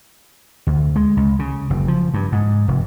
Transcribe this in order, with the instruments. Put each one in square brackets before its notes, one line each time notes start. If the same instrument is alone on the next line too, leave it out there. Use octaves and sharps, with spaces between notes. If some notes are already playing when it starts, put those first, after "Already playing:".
[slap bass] D2
G#3
C#2
C#3
F#1
F3
G2
G#2
F1